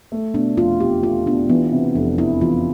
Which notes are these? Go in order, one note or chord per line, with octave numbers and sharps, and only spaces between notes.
A3
B2 D4
F1 F4
E2 G4
A3 F4
B2 D4
E3 B3
C3
F1 D4
E2 E4
E3 F4